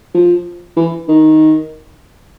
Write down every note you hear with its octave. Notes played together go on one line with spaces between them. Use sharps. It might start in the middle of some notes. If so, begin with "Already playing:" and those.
F3
E3
D#3